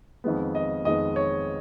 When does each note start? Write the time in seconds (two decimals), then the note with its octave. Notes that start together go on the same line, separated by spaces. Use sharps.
0.24 F2 D#3 G#3 B3
0.55 D#5
0.85 F2 D#3 G#3 B3 D#5
1.16 C#5